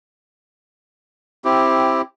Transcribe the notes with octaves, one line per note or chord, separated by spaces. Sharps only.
C4 E4 G4